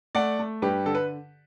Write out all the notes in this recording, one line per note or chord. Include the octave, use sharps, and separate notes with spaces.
A3 D5 F#5
A3
G2 G4 B4
D3 A4
B4